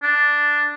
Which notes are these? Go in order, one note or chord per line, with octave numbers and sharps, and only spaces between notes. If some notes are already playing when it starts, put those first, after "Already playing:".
D4